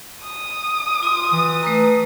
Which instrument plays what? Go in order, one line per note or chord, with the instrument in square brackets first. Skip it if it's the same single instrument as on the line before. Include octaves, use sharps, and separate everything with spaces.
[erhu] D#6
[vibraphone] F4 C6
[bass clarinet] E3
[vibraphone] A3 B4 A#5